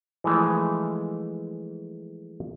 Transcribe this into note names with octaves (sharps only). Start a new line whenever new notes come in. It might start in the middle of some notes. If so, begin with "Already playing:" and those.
E3 F3 G#3 A3